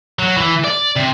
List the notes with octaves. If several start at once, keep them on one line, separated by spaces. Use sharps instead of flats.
F#3
E3
D5
C3